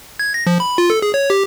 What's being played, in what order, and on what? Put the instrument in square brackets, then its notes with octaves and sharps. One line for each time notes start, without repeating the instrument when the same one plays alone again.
[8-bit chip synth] G#6
A#6
F3
B5
F4
A4
G#4
C#5
G4